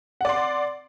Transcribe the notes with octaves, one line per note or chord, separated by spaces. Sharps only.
D5 F#5 C6